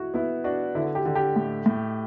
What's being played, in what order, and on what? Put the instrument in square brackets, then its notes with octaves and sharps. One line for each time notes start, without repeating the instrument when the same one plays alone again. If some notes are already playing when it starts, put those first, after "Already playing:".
Already playing: [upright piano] E4 F#4
[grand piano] B3 [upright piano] E4
[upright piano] D4 [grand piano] F#4
[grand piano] D3 [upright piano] E4
[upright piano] G4
[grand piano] D3
[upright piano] G4
[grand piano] A2
A2